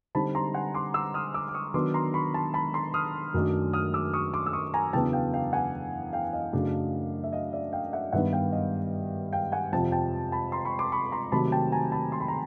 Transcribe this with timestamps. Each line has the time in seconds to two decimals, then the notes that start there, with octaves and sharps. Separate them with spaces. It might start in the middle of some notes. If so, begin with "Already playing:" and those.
0.15 D3 G3 C4 D#4 A5 B5
0.35 A#5 C6
0.55 F#5 G#5
0.74 C6 D6
0.94 D6 E6
1.14 D#6 F6
1.34 D6 E6
1.49 D6
1.54 C#6 D#6
1.74 D#3 F#3 B3 D4 C6 D6
1.94 A#5 C6
2.14 B5 C#6
2.34 A5 B5
2.54 A5 B5
2.74 A#5 C6
2.94 D#6 F6
3.34 F#2 D#3 F#3 A3 D4
3.73 D#6 F6
3.94 D6 E6
4.14 C#6 D#6
4.34 C6 D6
4.46 E6
4.53 C#6 D#6
4.74 G#5 A#5
4.93 E2 C#3 F#3 B3 D4 G5 A5
5.13 F5 G5
5.34 F5 G5
5.53 F#5 G#5
6.13 F5 G5
6.33 D#5 F5
6.53 F#2 C#3 F#3 A3 D4
7.24 E5
7.33 D#5 F5
7.53 D5 E5
7.73 F5 G5
7.93 E5 F#5
8.13 G2 D#3 G3 B3 D#4 E5 F#5
8.33 F5 G5
8.52 D#5 F5
9.32 F5 G5
9.52 F#5 G#5
9.72 F2 C3 F3 G5 A5
9.92 G5 A5
10.32 A5 B5
10.52 A#5 C6
10.65 B5 C#6
10.79 C6 D6
10.92 B5 C#6
11.12 A#5 C6
11.32 C3 D#3 F#3 A3 A5 B5
11.52 G5 A5
11.72 G#5 A#5
11.92 A5 B5
12.12 C6
12.20 B5
12.28 A#5